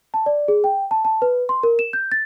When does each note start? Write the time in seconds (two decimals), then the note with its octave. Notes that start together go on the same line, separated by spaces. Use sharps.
0.14 A5
0.26 D5
0.48 G#4
0.64 G5
0.91 A5
1.05 A5
1.22 B4
1.49 C6
1.63 A#4
1.79 E7
1.93 G6
2.12 A6